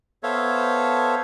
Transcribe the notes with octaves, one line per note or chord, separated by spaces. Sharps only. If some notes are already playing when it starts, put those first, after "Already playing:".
B3 A4 C5 C#5 E5 F5